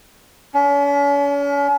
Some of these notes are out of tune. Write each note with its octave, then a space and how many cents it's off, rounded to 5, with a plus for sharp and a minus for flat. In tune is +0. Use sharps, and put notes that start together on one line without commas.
C#4 +40